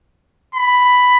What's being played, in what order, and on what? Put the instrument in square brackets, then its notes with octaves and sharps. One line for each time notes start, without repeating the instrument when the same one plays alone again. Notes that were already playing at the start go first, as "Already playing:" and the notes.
[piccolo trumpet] B5